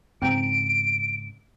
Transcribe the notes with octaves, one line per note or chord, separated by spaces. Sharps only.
G#2 C#3 C4 G5 A#5 D7